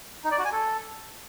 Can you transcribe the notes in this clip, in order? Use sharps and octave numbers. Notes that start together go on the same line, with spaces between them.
D#4
D5
F#4
G#5
A4